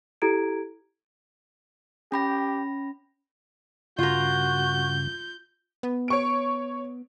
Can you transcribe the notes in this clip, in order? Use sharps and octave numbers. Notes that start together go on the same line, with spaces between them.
E4 G4 A4 A#5 G#6 D7
C#4 G4 B5 A#6
G2 C#3 F4 F#4 A#4 G6
B3
C#5 C#6 D7